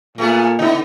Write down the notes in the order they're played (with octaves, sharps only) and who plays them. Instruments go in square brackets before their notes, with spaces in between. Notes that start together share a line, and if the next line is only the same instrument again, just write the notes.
[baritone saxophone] A#2 [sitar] A3 B3 G#4
[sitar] C#3 B3 [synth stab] D#4 E4